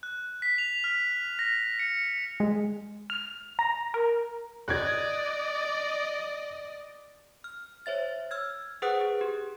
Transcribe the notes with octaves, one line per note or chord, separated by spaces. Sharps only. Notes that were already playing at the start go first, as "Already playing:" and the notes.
F#6
B6
F7
F6
A#6
C#7
G#3
F6
A#5
A#4
D5 D#5 F#6 G#6
F6
C5 C#5 E5 A6
E6 F6 G#6
G#4 B4 C5 F#5 D#6 F#6
G#4
G4